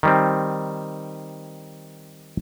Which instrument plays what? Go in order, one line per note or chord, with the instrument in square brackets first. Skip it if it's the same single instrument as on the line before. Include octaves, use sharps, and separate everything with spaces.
[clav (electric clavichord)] D#3 G3 C4